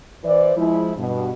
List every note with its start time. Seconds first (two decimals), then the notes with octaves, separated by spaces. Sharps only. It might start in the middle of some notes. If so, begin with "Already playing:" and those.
0.24 E3 C5 D5
0.57 F3 G#3 E4
0.97 G2 B2